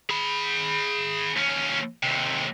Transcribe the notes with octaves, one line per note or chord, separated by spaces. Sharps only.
G#4 B5
D#2 C#4
D#2 C3